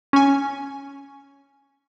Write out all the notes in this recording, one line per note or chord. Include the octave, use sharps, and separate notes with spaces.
C#4 G#5